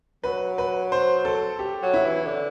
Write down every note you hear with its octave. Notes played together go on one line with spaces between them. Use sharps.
F#3 B4
B4
C5
A4
G4
F#3
E4
E3
D3